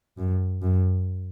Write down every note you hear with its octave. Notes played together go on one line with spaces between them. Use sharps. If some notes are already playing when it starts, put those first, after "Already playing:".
F#2
F#2